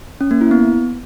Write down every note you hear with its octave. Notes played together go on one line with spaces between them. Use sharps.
C#4
A#3
E4
B3